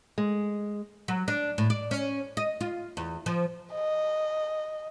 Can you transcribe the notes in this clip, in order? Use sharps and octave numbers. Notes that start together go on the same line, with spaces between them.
G#3
F#3
D4
A2
D5
C#4
D#5
F4
E2
F3
D#5